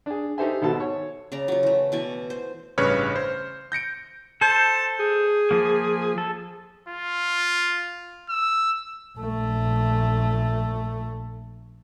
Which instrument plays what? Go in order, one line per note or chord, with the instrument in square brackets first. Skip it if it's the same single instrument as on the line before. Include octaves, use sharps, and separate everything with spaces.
[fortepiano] D4 G#4
D#4 G4 A4 C5 E5 G#5
G#1 B2 A4 A5
C#5
[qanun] C#3 D5 A#5
F#3 F4
E3 A3
B2 E3 D5 C#6
C5
[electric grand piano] A1 G2 C#3 B4 C#5 F6
C5
G6 A#6 C#7 D7
[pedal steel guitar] A4 C5 [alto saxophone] A5
[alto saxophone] G#4
[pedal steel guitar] F3 A#3
A4
[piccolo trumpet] F4
E6
[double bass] A#1 A3